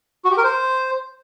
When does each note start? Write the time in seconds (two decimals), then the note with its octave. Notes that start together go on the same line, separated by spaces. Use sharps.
0.25 F#4
0.31 G4
0.37 A#4
0.44 C5